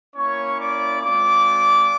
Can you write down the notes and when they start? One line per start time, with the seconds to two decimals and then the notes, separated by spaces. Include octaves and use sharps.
0.15 A#3 C#4 E4 C#5 C#6
0.59 D5 D6
1.02 G#3 C4 F4 D5 D6